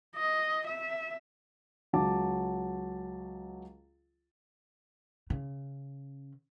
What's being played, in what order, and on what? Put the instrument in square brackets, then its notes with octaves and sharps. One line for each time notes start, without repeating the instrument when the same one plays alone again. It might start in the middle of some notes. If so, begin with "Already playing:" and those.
[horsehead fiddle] D#5
E5
[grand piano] C#2 F#3 F#4 A5 D6
[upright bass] C#3